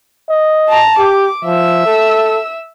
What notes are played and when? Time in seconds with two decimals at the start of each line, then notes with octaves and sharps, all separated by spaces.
0.29 D#5
0.69 A5 A#5
0.98 G4 D6
1.45 F3 E5 E6
1.86 A4